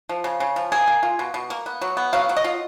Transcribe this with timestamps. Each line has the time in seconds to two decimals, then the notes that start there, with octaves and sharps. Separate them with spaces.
0.09 F3
0.24 C#3
0.40 C#3
0.56 F3
0.72 A#3 G#4
0.88 A#3
1.03 F4
1.19 B2
1.34 B2
1.50 A#3
1.66 B3
1.81 F#3
1.97 B3
2.13 F#3 F5
2.29 F#3
2.36 D#5
2.44 F4